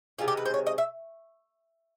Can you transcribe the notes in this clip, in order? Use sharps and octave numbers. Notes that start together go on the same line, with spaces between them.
C3 D#3 G#3 F4
G4
B4
C5
C#5
D#5
E5